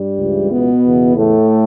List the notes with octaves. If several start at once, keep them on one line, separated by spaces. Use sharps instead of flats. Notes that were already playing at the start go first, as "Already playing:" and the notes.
Already playing: G2 G3
C#2 C#3 E3
B2 B3
E2 C#3 E3
A2 A3